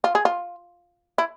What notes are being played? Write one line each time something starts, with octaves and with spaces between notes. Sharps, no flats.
F4
G#4
F4
E4